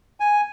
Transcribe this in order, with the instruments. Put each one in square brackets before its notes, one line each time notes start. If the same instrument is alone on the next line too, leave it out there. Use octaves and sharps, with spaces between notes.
[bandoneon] G#5